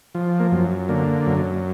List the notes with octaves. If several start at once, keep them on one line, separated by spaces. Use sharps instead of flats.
F3
A#3
F#2
D3 A#3
F#2